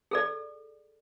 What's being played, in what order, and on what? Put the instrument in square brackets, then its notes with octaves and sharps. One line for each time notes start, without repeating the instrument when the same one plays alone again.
[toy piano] G#4 A4 D5